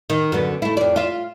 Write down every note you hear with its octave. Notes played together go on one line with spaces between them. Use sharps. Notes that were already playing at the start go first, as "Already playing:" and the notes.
D#3
F#2 D3 B3
A3 E4
F2 D5
F4 E5